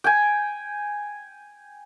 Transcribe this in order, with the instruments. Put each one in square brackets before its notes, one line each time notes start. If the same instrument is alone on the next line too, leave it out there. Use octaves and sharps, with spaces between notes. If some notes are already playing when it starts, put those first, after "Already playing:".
[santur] G5 G#5